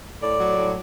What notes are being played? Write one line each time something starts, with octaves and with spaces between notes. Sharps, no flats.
A2 D5
F#3
A2